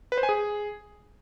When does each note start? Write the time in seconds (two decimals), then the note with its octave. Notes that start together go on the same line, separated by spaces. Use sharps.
0.12 B4
0.18 C5
0.23 G#5
0.29 G#4